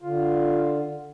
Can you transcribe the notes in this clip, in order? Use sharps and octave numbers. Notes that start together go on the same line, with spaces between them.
D3 F4